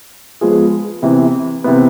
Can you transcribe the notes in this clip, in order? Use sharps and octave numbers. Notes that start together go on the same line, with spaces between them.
F3 G#3 B3 F4 G#4
C3 E3 B3
C3 E3 B3